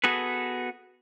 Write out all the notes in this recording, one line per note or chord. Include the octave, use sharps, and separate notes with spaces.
B3 F#4 G#4 A4 B4